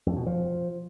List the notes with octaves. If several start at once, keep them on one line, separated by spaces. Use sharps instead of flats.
F2
B2
F3